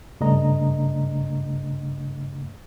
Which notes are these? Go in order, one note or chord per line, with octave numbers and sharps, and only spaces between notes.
G2 C#3 A3 D4 D#5 A#5